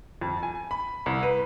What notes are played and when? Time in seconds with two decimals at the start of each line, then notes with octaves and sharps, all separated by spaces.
0.21 F2
0.43 G#5
0.71 B5
1.06 C2
1.23 B4